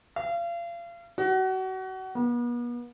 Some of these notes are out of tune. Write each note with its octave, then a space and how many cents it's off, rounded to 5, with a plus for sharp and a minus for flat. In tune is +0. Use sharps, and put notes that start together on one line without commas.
F5 -35
F#4 +30
B3 -40